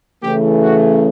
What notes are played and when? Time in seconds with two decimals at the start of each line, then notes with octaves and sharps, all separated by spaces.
0.22 C#3 E3 A3 G4
0.62 F#4